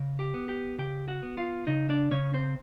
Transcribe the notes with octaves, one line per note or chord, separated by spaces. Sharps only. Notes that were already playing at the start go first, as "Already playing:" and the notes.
Already playing: C#3
G4 G5
B3
G4 G5
C#3 G4 G5
F#4 F#5
B3
F4 F5
C#3 D#4 D#5
D4 D5
C#3 C#4 C#5
C4 C5